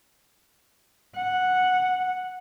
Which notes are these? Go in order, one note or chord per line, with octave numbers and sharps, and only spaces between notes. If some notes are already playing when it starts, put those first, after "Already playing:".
F#5